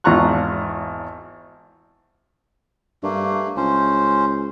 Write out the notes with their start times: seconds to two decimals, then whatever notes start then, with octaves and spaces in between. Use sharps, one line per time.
0.04 G#1 E2 F4 A#5 C#6 F#6
3.03 G2 A3 A#3
3.57 C#2 C#4 C5